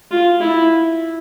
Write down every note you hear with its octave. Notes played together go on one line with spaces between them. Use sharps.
F4
E4